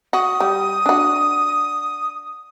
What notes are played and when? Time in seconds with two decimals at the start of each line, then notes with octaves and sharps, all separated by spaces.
0.13 F#4 D#6
0.40 G3
0.86 D4 F#4